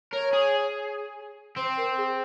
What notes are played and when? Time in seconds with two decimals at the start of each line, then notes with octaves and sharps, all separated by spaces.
0.12 A#4 C#5
0.33 G#4
1.56 C4 C5
1.77 A#4
1.97 G#4